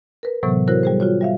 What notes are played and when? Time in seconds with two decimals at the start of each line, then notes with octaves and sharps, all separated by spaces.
0.23 A#4 B4
0.43 A2 C3 E3 F#3 B3
0.68 E4 F#4 A4 A#4 C5 C#5
0.83 G3 G#4 C5
1.00 F4 F#4 C#5
1.21 G3 E5 F5